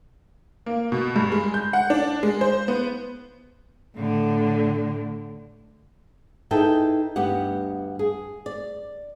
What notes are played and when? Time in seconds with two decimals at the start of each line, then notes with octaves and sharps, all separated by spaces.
0.66 A#3
0.92 B2
1.16 G2
1.32 G#3
1.54 G6
1.73 F#5
1.90 D4
2.23 G#3
2.41 C5
2.68 B3
3.96 A2 D3
6.51 D#4 E4 G#4 A4 B4 G5
7.16 D2 G2 B3 G4 F#5
7.99 G#4
8.46 D5